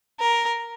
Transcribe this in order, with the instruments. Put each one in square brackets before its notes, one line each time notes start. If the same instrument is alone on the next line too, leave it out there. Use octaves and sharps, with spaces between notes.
[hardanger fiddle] A#4